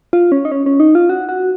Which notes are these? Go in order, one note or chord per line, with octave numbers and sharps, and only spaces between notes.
F4
C#4
D#4
C#4
C#4
D#4
F4
F#4
F#4